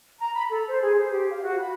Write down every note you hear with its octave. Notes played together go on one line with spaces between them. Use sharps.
A#5
B5
A4
C5
G#4
C5
G4
F5
F#4
B5